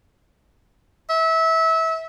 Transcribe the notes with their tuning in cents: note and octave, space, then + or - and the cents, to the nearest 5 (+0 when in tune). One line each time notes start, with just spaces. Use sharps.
E5 -25